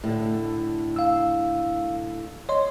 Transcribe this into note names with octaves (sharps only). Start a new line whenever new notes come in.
A2 D3
F5 E6
C#5 D#5 C6